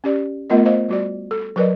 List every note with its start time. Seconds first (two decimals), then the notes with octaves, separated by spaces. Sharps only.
0.04 C#4 G4 D5
0.50 A3 B3 F4 A#4 D#5
0.65 C5 D#5 F5
0.89 G3 F#4 D5
1.31 A4
1.56 F#3 A#4 B4 D5 D#5